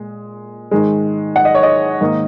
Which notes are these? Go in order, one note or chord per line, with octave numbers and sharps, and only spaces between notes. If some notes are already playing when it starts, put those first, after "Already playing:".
Already playing: A#2 G#3
G#2 D#3 G#3
F#5
D#5
C#5
D#5
G#2 D#3 A#3